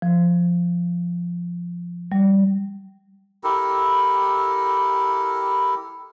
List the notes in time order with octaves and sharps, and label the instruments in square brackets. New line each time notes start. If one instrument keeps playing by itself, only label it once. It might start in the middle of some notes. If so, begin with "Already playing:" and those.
[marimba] F3
G3
[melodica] E4 G4 A4 A#4